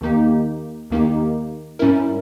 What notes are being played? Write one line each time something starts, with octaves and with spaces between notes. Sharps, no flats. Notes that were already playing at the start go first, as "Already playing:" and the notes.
D#2 D#3 A#3 D#4 G4
D#2 D#3 A#3 D#4 G4
G#2 G3 C#4 E4 A#4